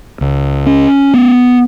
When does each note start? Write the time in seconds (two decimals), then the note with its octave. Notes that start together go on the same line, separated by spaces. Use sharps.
0.21 C#2
0.66 C#4
1.14 B3